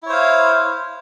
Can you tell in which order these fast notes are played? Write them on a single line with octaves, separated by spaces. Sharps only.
E4 C#5 C5 F5